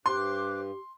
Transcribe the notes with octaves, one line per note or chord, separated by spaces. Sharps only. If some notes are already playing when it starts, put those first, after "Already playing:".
G2 G4 C5 C6 D6 F#6